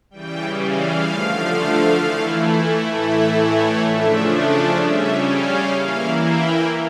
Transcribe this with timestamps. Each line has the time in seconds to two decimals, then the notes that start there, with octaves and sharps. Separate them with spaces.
0.10 C#3 E3 G3 G5
0.57 F5
1.04 D3 F3 A3
1.98 E3 A3 E4
2.91 A2 E3 A3 E4 E5
3.38 C#5
3.85 C#3 F3 A3 D4 E5
4.32 D5
4.79 C#3 G3 C#4 E5
5.26 F5
5.72 E3 A#3 E4 F5
6.20 G5